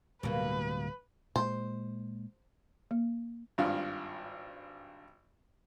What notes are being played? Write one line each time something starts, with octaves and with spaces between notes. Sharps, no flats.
D1 B2 G3 A#3 B4
A#2 G#3 C5
A#3
G#1 G2 F4